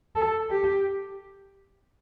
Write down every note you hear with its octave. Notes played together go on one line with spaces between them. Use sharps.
A4
G4